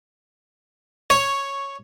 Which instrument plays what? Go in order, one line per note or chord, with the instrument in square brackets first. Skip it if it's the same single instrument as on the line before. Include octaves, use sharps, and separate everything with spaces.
[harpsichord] C#5